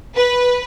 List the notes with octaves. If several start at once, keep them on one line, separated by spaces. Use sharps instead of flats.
B4